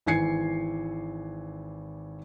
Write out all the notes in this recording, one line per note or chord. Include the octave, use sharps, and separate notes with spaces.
G#1 E3 G#5 G#6 C7 C#7